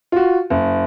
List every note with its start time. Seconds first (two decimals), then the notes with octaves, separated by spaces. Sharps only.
0.12 F4 F#4
0.50 F#1